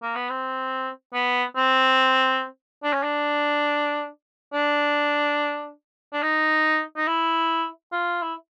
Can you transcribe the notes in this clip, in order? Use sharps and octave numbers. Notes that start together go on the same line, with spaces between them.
A#3
B3
C4
B3
C4
D4
C#4
D4
D4
D4
D#4
D#4
E4
F4
E4